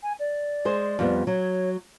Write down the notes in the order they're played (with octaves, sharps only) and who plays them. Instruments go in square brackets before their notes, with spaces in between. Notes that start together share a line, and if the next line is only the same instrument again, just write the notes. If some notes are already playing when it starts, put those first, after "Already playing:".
[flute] G#5
D5
[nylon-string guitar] G#3 G#4 C5
F2 G3 B3
[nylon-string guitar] F#3 [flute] C#5